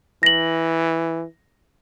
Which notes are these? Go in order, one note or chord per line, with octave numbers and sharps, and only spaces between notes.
E3 A#6 F#7